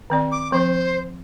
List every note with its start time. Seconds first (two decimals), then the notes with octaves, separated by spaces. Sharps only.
0.10 D#3 C4 D5
0.32 D6
0.52 F3 C4 C5